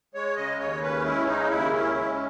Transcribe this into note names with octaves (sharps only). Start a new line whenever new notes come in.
G#3 C#5
C#3 D#5
D#2 C#5
C#4 B4
G#3 E4
C#3 D#4
D#2 E4
C#4
G#3